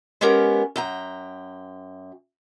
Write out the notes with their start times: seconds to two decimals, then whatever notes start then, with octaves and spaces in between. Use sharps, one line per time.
0.21 G#3 B3 C#4 G4 A#4
0.76 F#2 G5 A#5